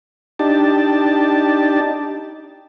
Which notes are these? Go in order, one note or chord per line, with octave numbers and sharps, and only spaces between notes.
D4 D#4 G4 A5